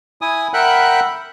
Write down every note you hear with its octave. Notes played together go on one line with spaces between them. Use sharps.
E4 G#5 D#6
A#4 E5 F#5 G5 B5 F#6